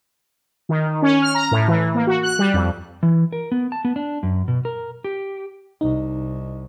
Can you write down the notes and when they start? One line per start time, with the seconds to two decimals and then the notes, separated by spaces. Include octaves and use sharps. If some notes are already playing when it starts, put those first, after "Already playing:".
0.69 D#3
1.02 C#4
1.22 F6
1.35 A#5
1.51 A2
1.68 E3
1.95 A#3
2.07 F#4
2.23 F#6
2.39 G3
2.54 F2
3.03 E3
3.33 A#4
3.52 B3
3.72 A5
3.85 B3
3.96 D4
4.23 F#2
4.48 B2
4.65 A#4
5.04 G4
5.81 C2 D#4